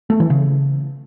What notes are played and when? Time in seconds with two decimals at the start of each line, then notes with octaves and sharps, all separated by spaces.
0.10 A3
0.20 E3
0.30 C#3